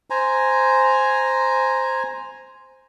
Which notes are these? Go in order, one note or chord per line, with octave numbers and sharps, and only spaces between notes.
C5 G#5 A#5